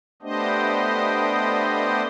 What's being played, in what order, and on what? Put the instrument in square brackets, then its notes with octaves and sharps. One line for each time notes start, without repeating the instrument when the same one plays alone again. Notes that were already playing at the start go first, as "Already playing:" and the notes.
[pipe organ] A3 B3 D4 G4 C5 D#5